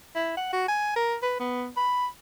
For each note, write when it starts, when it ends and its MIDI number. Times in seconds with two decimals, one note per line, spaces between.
0.15 0.34 64
0.37 0.50 78
0.53 0.66 66
0.68 0.93 80
0.96 1.16 70
1.22 1.36 71
1.40 1.68 59
1.77 2.07 83